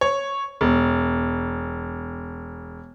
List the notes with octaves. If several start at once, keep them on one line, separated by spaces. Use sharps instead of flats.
C#5
E1